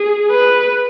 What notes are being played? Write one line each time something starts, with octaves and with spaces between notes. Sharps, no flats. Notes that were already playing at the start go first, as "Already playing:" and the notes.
Already playing: G#4
B4